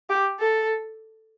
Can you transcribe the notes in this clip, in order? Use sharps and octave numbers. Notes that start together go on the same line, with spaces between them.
G4
A4